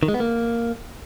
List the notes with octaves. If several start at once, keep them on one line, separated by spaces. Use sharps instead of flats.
D#3
G#3
B3
A#3